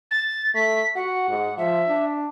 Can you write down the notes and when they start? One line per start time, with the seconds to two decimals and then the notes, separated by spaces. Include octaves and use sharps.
0.11 A6
0.55 A3 B6
0.96 F#4 F#5
1.29 G#2
1.58 F3 E5
1.88 D4